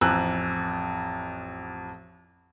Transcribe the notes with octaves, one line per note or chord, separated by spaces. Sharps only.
A1 F2 G#5 A#5 E6 F#6